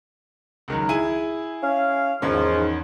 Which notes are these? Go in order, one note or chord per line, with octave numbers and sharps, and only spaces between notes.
C#2 D#3 F#3
E4 G#4 D#7
C#4 F5
E2 G#2 D#3 F3 C#4